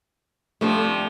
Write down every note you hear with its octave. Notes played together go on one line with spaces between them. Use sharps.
G2 C3 F3 A3